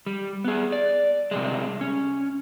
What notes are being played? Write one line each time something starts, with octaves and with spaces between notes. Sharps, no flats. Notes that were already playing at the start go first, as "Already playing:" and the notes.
G3
B3 G#4
D5
C3 G3 G#3
C#4